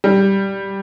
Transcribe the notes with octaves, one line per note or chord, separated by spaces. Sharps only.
G3